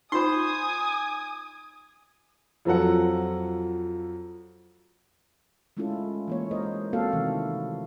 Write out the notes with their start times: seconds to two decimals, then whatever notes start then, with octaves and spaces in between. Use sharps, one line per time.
0.12 D#4 F4 C5 G#5 C6 C#6 D#6
2.65 F2 F3 F#3 A4 F#5
5.77 G#3 A3 C#4 E4 F4 A4
6.27 E3 A#3 C#5
6.51 G#3 A#3 A#4 C5 D#5
6.93 A#3 C4 F#4 A4 F5
7.13 C3 D#3 E3 A3